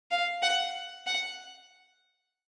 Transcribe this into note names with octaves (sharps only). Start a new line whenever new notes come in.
F5
F#5
F#5